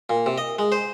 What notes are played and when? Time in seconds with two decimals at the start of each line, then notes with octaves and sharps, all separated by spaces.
0.10 A#2
0.26 C3
0.38 D#5
0.59 G#3
0.72 C5